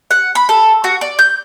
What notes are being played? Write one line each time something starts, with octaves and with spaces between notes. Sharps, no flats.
F#5
B5
A4
F#4
D5
G6